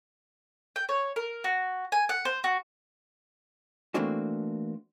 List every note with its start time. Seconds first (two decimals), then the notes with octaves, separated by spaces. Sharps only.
0.76 G5
0.89 C#5
1.16 A#4
1.44 F#4
1.92 G#5
2.09 F#5
2.25 C5
2.44 F#4
3.94 E3 A3 A#3 C4 D4 F#4